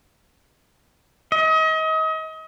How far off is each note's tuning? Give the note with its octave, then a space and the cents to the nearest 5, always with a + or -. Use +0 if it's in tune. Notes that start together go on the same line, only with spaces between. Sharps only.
D#5 +35